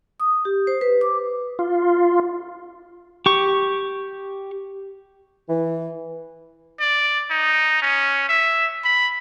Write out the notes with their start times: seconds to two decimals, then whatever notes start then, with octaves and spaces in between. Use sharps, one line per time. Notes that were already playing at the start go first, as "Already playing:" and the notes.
0.20 D#6
0.45 G4
0.67 C5
0.81 B4
1.01 D6
1.59 F4
3.26 G4 C#6
5.50 E3
6.80 D5
7.31 D#4
7.82 C#4
8.29 E5
8.84 B5